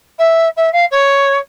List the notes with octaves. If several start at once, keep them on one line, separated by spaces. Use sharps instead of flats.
E5
E5
F5
C#5